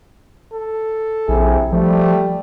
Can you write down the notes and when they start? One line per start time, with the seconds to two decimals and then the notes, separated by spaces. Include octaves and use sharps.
0.53 A4
1.28 A#1 C3 E4 G#4
1.72 F3 G3 A3